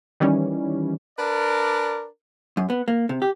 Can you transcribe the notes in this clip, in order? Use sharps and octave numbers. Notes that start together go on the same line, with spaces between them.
D#3 E3 G3 C#4
D4 A#4 B4 D5
F#2
B3
A#3
C3
G4